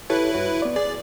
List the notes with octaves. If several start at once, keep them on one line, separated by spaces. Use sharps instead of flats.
E4 G4 A4 B4 C#5
G2 F#4 C#5
B3 D5
G#4 D5